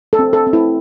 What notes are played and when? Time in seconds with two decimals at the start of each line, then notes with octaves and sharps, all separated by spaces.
0.13 A4
0.19 C4
0.33 A4
0.47 C4
0.53 E4